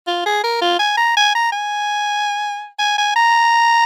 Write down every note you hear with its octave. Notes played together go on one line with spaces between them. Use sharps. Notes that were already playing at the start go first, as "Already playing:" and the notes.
F4
G#4
A#4
F4
G#5
A#5
G#5
A#5
G#5
G#5
G#5
A#5